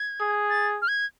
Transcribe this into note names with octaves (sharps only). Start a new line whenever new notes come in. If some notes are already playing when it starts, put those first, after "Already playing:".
Already playing: G#6
G#4
A6
F6
G#6